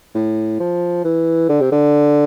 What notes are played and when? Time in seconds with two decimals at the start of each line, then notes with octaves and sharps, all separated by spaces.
0.15 A2
0.60 F3
1.05 E3
1.49 D3
1.61 C3
1.72 D3